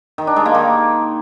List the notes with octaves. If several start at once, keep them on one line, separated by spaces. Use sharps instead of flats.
D#3
D4
G#3
A#3
D#3